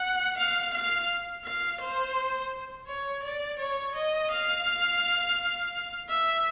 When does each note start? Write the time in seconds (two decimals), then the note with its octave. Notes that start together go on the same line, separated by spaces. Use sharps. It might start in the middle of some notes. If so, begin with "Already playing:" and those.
Already playing: F#5
0.37 F5
0.73 F5
1.45 F5
1.80 C5
2.87 C#5
3.22 D5
3.59 C#5
3.95 D#5
4.31 F5
6.09 E5